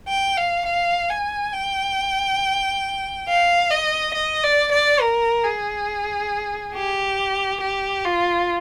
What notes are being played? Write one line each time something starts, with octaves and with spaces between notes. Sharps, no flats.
G5
F5
F5
G#5
G5
F5
D#5
D#5
D5
D5
A#4
G#4
G4
G4
F4